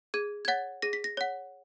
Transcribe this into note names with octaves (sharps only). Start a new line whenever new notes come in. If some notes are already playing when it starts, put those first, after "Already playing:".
G#4 G#6
G#6
C#5 F#5 A6
G#4 A#6
B6
A#6
C#5 F#5